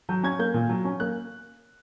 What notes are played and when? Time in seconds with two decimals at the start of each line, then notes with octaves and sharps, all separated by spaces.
0.09 F#3 G6
0.23 C#4 G#6
0.39 A#3 G6
0.54 A#2
0.69 F#3
0.85 C#4
1.00 A#3 F#6